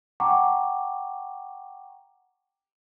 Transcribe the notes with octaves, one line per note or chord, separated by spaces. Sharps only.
F#5 G5 A5 A#5 C#6 D6